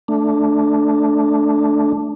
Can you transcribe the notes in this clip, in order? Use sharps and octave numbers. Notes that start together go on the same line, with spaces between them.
A3 D4